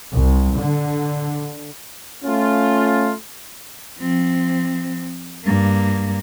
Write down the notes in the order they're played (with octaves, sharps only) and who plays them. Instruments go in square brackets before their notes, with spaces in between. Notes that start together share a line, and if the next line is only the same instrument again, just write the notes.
[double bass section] C2
D3
[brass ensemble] A3 C#4 F4
[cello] F3 C4
G2 A#3